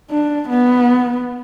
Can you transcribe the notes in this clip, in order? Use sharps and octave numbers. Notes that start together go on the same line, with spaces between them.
D4
B3